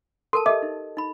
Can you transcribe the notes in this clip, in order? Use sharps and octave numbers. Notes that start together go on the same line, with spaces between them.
A4 A#4 A5 C6
G4 A4 D#5 E5 D6
D#4
D#4 B5